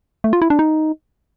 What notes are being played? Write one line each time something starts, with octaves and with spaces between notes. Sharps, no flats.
A3
F4
E4
D4
D#4